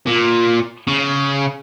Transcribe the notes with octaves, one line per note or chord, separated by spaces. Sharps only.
A#2
C#3